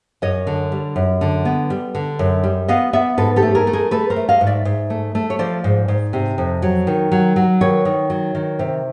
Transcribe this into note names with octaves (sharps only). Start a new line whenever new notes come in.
F#2 C#5 D#5
D3
G3
F#2
D3
B3
G3
D3
F#2
G3
B3 D#5 F5
B3 D5 E5
G#2 A4 B4
G4 A4
A3
G#4 A#4
A3
G#4 A#4
A3 A4 B4
A#4 C5
A3
D#5 F5
G#2
D5 E5
G#2
A3
A3
C#5
F3 C5 D5
G#2
G#2
C3
F2
F#3
D#3
F#3
F#3
D#3 B4 C#5
D#3
F#3
D#3
C3